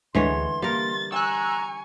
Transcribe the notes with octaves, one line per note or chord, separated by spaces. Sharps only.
D2 D3 E3 G#3 C#5 C6
G3 A#3 A#4 A6
G#5 A#5 C#6 E6 F#6